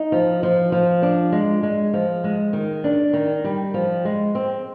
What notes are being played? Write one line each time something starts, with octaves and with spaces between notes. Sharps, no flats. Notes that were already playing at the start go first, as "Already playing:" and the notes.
Already playing: D#4
F3
F3
F3
D4
G#3
G#3
F3
G#3
D#3
D4
D#3
G3
F3
G#3
C4